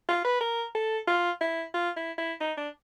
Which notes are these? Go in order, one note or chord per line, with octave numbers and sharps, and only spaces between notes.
F4
B4
A#4
A4
F4
E4
F4
E4
E4
D#4
D4